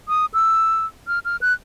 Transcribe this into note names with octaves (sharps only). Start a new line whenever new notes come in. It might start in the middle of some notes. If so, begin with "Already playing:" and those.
D#6
E6
F6
F6
F#6